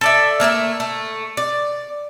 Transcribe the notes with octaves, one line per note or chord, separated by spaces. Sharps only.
A4 D5 E5
A3 A#3 C#5 E5
A3
D5